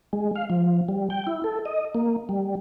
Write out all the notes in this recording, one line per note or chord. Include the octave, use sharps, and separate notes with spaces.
G#3
F5
F3
G3
G5
E4
A4
D#5
A#3
G3